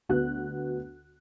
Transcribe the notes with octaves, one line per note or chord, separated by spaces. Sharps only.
D2 B3 F#4 F#6